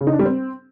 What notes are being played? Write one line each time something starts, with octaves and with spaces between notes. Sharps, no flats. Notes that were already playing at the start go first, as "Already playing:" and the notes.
C#3
D#4
D4
G3
C4